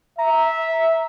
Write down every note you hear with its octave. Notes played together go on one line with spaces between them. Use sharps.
E5 A#5